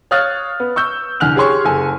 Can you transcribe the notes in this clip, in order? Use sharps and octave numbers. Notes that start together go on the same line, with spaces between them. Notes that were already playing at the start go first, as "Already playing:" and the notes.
C#5 F5 D#6 F6 F#6 A6
B3
C#6 E6 G6
C2 D3 G#5 F6 F#6 F7
G4 G#4 C#5 C6 C#6
F#1 A4 G#5